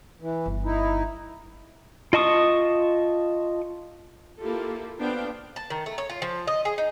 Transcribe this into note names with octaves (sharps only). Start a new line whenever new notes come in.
E3
G1
D#4 E4
F4 D#5 A5 C#6 D#6
A#3 E4 F4 G4 A4
B3 D4 C5 F5 G5
A5
D#3
A3
C#5
F4
F3
D#5
G#4
D#4